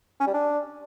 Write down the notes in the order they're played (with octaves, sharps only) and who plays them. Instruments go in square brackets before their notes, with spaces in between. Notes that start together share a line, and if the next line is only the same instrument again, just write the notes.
[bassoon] C#4
G3
D4